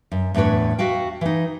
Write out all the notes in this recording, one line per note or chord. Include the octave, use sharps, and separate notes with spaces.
F#2
E2 A2 D4 B4 C#5
F#4 E5 F5 G5
E3 D#4